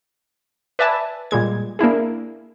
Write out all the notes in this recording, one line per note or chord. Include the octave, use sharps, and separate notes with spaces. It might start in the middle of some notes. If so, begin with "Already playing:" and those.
B4 D5 E5 G#5 A5
A#2 G3 G#3 G#6
A#3 D4 E4 G#4